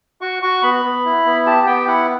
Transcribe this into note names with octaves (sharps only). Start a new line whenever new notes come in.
F#4 C#6
F#4 C#6
B3 B5
B3
E4
B3
G4 A5
B3 G5
E4 F#5